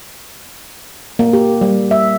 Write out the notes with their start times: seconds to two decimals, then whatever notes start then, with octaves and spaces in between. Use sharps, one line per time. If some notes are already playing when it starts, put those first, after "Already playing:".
1.19 A#3
1.33 G4
1.61 G3
1.91 E5